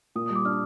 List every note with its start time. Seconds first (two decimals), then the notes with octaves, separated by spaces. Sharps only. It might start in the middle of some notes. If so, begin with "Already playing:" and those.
0.16 A#2 D#6
0.26 G3 D#6
0.35 D6
0.45 D4 F6